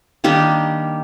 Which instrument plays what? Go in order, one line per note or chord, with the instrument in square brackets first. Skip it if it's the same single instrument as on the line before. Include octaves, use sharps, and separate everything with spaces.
[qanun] D#3 G3 A#3 D4 G4